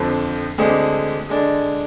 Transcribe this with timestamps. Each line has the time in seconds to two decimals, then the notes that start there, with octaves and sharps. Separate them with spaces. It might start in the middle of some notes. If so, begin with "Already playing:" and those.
Already playing: F2 D3 F3
0.58 D2 D3 G#3 C4
1.29 D3 G#3 D4